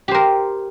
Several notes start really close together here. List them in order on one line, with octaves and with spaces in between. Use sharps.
G4 C5 A#4